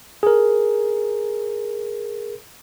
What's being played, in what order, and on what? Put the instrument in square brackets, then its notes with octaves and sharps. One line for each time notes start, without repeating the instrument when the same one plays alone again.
[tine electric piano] G#4 A#4